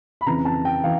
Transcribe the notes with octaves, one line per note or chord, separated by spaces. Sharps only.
B5
F2 C#3 E3 A#5
A5
G5
E3 F5